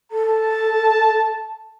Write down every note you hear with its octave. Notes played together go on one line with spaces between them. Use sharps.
A4 A5